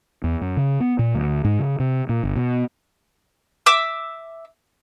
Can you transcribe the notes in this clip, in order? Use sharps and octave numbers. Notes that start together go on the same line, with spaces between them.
E2
F#2
C#3
B3
A#2
D2
G#2
C#3
C3
A#2
G1
B2
E5 D6 E6